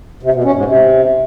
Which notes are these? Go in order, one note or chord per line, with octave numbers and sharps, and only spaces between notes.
C3
B2
C#4
G#2
C3